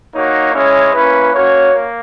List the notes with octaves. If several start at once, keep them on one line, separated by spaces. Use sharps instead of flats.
A#3 D#4 F#4 C#5
G#3 C#4 E4 C#5
A#3 C#4 E4 B4
A#3 C#4 F#4 C#5
A#3